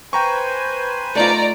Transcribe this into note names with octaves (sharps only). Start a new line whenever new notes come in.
B4 C5 G5 G#5 A#5 C#6
A3 D#4 F4 D5 A#5